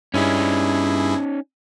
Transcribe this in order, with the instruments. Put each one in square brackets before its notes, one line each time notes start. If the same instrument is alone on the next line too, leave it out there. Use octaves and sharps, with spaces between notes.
[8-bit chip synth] G2 E4 G#4 [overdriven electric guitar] C#4 D#4